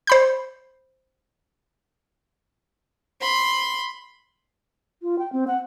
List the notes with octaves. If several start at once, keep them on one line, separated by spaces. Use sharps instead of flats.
C5 B5 G6
B5 C6
F4
G5
C4
F#5